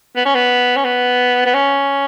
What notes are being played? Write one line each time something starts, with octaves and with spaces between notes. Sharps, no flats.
B3
C#4
B3
C#4
B3
B3
C#4